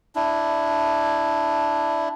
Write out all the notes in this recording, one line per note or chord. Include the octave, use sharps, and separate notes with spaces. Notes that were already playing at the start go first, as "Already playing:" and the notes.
D4 E4